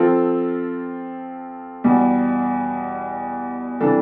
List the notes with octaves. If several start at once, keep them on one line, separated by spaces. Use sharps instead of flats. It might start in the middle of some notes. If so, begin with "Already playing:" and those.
Already playing: F3 C4 F4 A4
E2 B2 G3
C3 E3 G3 D4 A4